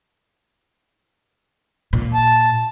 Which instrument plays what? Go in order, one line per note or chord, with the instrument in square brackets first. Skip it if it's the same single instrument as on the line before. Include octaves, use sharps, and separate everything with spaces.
[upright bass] A#2
[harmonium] A5